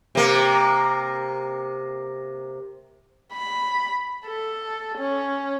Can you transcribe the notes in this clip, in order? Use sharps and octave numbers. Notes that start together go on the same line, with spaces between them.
C3 A#3
B5
A4
C#4